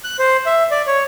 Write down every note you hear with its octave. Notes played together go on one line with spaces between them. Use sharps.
F#6
C5
E5
D5
C#5